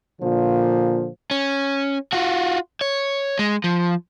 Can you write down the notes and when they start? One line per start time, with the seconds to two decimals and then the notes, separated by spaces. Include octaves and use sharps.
0.21 A#2 D3 F3
1.31 C#4
2.13 F4 F#4
2.81 C#5
3.39 G#3
3.64 F3